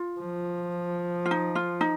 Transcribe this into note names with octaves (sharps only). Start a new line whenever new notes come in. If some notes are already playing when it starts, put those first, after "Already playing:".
Already playing: F4
F3
F4
D#4
F4
D#4